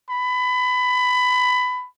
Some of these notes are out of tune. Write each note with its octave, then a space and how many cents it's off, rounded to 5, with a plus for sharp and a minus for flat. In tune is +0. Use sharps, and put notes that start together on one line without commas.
B5 +20